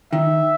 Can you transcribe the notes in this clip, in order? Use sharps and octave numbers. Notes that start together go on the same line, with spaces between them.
D#3 E5